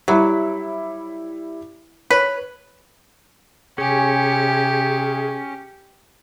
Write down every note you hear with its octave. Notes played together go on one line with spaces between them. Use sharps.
F#3 G3 E4 B5
B4 C#5
C3 C#4 G4 G#4